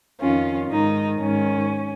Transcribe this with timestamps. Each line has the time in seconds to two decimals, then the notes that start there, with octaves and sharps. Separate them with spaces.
0.20 F2 D#3 C#4 F4
0.70 G#2 D#3 D#4
1.20 G#2 D#3 C#4